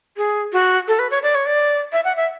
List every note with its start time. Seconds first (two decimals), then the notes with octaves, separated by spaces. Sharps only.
0.17 G#4
0.53 F#4
0.88 A4
0.99 B4
1.11 C#5
1.23 D5
1.35 C#5
1.46 D5
1.93 E5
2.04 F#5
2.17 E5